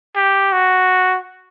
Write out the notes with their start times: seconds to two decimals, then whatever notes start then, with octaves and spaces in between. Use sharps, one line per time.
0.16 G4
0.53 F#4